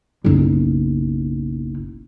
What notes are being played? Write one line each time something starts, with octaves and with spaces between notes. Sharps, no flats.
F#1 B1